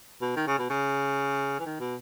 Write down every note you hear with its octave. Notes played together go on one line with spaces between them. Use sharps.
B2
D#3
C#3
B2
C#3
E3
D#3
B2